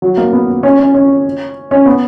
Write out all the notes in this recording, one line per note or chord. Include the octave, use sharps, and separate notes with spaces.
F#3
A#3
B3
C#4
C#4
C#4
C#4
B3